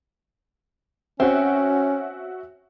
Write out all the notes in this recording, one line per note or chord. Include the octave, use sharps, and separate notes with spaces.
C4 C#4 F#4 E5